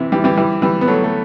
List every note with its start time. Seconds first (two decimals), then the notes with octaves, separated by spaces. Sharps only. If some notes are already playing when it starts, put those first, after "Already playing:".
Already playing: C3 E3
0.12 E3 G3
0.24 E3 G3
0.37 E3 G3
0.62 E3 G3
0.81 B3
0.87 F#3 A3
1.04 A3